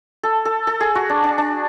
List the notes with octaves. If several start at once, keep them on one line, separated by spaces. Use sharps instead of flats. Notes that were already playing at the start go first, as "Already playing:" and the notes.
A4
A4
A4
G#4
F#4
D4
D4
D4